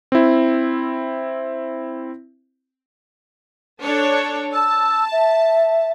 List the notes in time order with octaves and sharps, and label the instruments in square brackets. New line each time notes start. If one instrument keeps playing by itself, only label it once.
[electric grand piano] C4 E4
[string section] D4 A4 C#5
[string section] A5 [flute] E6
[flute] E5